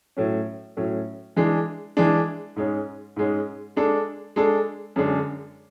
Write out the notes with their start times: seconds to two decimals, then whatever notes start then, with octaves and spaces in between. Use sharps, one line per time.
0.17 A2 F#3 C#4
0.77 A2 F#3 C#4
1.37 E3 G#3 D4
1.97 E3 G#3 D4
2.56 G#2 G#3 C#4
3.16 G#2 G#3 C#4
3.76 G#3 D4 A4
4.36 G#3 D4 A4
4.96 F#2 D3 G#3 D4